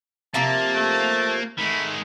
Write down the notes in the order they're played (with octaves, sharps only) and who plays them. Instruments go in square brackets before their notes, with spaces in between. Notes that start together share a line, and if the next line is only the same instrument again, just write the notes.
[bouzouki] C3 F3 A#5 [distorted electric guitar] A#3 [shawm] A5
[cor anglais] A3
[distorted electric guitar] D#3 G#3 [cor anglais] A3 [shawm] B5